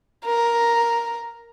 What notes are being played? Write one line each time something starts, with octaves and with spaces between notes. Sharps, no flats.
A#4